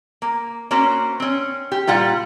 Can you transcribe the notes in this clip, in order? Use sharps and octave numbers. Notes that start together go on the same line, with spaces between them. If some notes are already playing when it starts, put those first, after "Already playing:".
A#3
A#3 C#4 F#4 C5
C4 C#4
G4
A#2 G3 F4 F#5